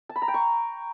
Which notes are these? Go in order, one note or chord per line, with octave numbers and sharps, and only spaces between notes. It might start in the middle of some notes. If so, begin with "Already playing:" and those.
A5
B5
A#5
G5
C#6